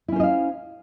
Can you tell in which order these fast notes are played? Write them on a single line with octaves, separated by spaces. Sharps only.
E4 C#4 C5 D#5 F5